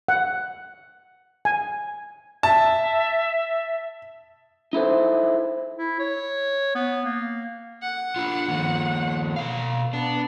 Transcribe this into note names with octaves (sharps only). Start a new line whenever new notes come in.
F#5
G#5
E5 A5
D#4 E4 A4 C5
E4
C#5
B3
A#3
F#5
D4 F4
D#3 F3 A#3
B2 D#3 F5
B3 D4